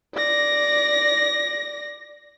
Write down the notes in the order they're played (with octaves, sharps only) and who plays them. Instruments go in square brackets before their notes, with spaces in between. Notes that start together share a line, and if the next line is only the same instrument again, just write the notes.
[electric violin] D5 A#6